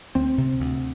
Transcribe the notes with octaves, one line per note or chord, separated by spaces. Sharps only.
D2 C4
C3
D2